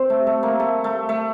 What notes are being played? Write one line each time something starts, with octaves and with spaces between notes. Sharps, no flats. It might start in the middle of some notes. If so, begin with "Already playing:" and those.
Already playing: C4
A3
A3
A#3
A3
A3
A3